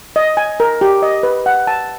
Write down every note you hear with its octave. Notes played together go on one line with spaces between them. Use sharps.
D#5
G#5
A#4
G4
D#5
B4
F#5
A5